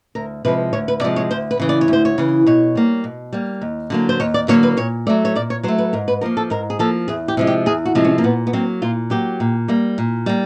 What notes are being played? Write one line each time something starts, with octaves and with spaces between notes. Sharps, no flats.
D2 A#4
C3 F3 G#3 B4
D2 C#5
B4
C3 F3 G#3 D5
C#5
D2 C5
B4
C#3 E3
D5
C#5
D2 C5
C#5
C#3 E3
B2 C#5
G3 A#3
B2
G3 A#3
D#2
D3 F#3 A#3
C5
D#2 C#5
D5
D3 F#3 A#3 C#5
B4
A#2 C#5
F#3 A3 D5
C#5
A#2 D5
C#5
F#3 A3 C5
B4
G#2 A#4
B4
F3 A#3 A#4
A4
G#2 A#4
G#4
F3 A#3 A4
E2 G#4
G4
C3 F3 G#3
G4
E2 G#4
F#4
C3 F3 G#3
C#4
A#3
A#2 B3
B3
F#3 A#3 C4
A#2 F4
F#3 A#3 G4
A#2
G3 A#3
A#2
G3 A#3